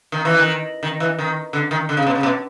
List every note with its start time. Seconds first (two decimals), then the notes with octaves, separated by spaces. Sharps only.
0.12 D#3
0.25 E3
0.38 D#3
0.83 D#3
1.00 E3
1.19 D#3
1.53 D3
1.71 D#3
1.89 D3
1.97 C#3
2.07 B2
2.15 C#3
2.23 B2